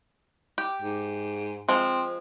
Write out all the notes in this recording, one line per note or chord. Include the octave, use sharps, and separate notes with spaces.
G4
G#2
F3 G#3 C4